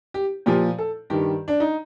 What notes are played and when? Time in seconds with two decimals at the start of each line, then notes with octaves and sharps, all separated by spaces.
0.14 G4
0.46 A#2 F3 G4
0.78 A4
1.10 G2 D#3 G4
1.48 D4
1.60 D#4